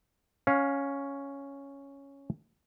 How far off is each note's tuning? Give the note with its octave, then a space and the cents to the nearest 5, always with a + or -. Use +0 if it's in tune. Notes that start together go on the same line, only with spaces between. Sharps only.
C#4 +0 F5 +15